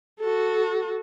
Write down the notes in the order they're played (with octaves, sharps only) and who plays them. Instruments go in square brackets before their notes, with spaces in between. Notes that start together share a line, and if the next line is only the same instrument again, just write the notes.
[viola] F#4 A4